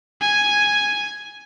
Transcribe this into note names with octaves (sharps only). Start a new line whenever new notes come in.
G#5